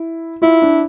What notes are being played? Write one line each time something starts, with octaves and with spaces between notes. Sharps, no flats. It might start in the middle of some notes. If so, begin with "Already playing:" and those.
Already playing: E4
E4 F4
D4